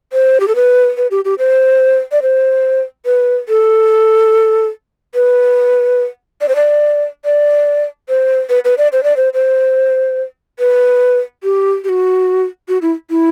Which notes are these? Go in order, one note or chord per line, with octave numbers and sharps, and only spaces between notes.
C5
G4
A4
B4
B4
G4
G4
C5
D5
C5
B4
A4
B4
D5
C5
D5
D5
C5
B4
B4
D5
C5
D5
C5
C5
B4
G4
G4
F#4
F#4
E4
E4